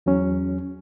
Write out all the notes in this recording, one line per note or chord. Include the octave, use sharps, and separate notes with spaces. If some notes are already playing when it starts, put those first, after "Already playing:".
E2 F#3 C#4